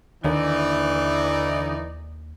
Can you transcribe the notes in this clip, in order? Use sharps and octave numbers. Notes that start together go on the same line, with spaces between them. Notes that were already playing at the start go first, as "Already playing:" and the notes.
D#2 D3 E3 D#4 D5